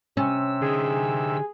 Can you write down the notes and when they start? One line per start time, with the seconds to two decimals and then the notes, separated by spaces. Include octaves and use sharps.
0.17 C3 C#4 E6
0.62 D3 D#4 G#4